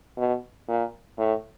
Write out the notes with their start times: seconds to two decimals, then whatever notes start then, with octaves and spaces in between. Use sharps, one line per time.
0.17 B2
0.68 A#2
1.18 A2